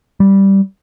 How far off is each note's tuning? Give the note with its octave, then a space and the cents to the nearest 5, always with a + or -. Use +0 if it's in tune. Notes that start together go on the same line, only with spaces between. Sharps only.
G3 -5